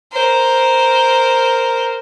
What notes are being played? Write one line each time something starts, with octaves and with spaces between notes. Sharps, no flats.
A#4 C5